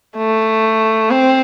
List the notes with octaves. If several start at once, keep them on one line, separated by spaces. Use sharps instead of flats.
A3
C4